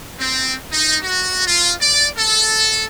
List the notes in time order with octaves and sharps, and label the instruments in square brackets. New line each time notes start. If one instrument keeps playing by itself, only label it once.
[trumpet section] C4
D#4
F#4
F4
D5
A4